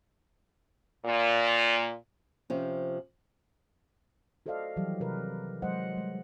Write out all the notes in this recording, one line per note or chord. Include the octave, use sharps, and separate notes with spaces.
A#2
C3 F3 C#4
F#4 A4 C5 D5 D#5 F5
D#3 E3 F#3 G3 G4 F5
C3 G4 A#4 B4
F#3 G#3 C5 D#5 F#5
G3 G#3